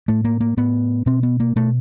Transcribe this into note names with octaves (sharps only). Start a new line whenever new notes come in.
A2 A3
A#3
A#3
A2 B3
B2 C4
B3
A#3
B2 A3